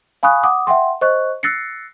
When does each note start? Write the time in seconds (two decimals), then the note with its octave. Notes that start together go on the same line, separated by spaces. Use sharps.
0.23 F5 G#5 B5 C#6 D#6 F#6
0.43 F#5 D6 D#6
0.67 E5 F#5 G5 C6
1.01 C5 D#5 C#6 F#6
1.43 E6 F#6 A6 A#6 C7 C#7